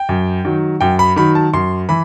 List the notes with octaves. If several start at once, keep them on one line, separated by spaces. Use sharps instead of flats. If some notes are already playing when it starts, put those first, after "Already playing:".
Already playing: G5
F#2
D#3 F#3
F#2 G5
B5
D#3 F#3 B5
A5
F#2 C6
E3 B5